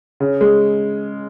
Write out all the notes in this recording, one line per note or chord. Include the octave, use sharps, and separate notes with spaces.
C#3
G#3